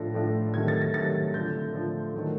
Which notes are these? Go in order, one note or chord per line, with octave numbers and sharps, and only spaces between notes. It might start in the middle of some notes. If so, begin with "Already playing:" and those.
Already playing: A2 F3 A3 D4 A#6
A2 F3 A3 D4
C3 D#3 F#3 A3 G#6
A6
A#6
C3 D#3 F#3 A3 A6
D3 F3 A3 D4 G6
D3 F3 A3 D4
D#3 F#3 A3